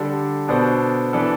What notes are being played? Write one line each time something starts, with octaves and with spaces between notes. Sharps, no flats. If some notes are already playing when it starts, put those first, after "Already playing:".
Already playing: D3 G3 D4 A4
B2 B3 D4 A4 C5
E3 B3 D4 A4